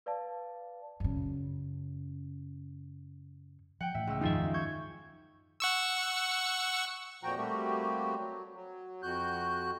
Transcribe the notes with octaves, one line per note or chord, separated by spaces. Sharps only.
B4 D5 F5 A5
F#2 C#3
F3 F#5 G5
A2 E3 E5
C#2 E6
F2 G#2 D#3 F3 G#3 D#4 F4 E5
F#2
C#6 G6 G#6
F#5 C#6 E6
F2 A#2 F3 F#4 G5 A#5
G3 A3 A#3 C4 F#4 G4
F#3
F#3
F2 F#4 F#6 G6